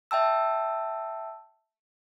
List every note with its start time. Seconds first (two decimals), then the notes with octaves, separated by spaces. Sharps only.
0.11 E5 G5 A5 E6